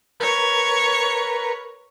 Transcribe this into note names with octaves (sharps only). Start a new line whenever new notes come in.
A#4 B4 C#5